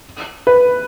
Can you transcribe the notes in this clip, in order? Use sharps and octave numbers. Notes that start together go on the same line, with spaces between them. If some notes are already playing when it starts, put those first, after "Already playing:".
B4